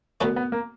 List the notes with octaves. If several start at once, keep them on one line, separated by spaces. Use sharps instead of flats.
F#2 D3 F#3 A3 B3 C#4
B3
A#3